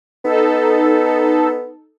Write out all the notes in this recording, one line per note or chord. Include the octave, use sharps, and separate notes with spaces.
B3 D#4 A4